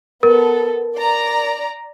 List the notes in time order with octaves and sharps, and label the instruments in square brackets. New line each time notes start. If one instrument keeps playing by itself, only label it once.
[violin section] B3 A4 [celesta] A#4
[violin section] D5 A#5